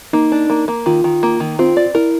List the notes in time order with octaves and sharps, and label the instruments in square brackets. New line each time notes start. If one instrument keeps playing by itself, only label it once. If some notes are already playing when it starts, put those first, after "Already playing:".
[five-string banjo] A#3 [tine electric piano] D#4
[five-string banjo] D4
A#3
A#3
[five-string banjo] D#3 [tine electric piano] F4
[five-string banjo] D#3
A#3
D#3
[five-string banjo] C4 [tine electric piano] F4
[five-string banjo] D5
[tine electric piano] E4 [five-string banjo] A#4